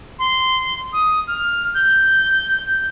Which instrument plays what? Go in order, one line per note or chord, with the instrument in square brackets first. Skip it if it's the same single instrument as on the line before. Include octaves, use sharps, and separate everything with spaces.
[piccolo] C6
D#6
F6
G6